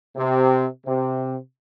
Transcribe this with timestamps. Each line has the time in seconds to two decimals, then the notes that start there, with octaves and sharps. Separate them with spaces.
0.16 C3
0.86 C3